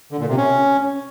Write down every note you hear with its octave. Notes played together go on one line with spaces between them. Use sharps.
D3
A#2
C3
C#4